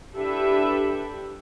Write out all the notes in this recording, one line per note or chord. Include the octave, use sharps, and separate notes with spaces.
D4 E4 G4 A4 B4 E5